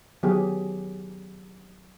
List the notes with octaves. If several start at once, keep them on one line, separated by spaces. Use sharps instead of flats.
D#3 F#3 B3 G4 G#4